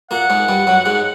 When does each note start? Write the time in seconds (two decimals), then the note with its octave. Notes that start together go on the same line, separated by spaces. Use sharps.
0.11 A#2 A#3 F#5
0.30 G#2 G#3
0.49 G2 G3
0.67 F#2 F#3
0.86 G#2 G#3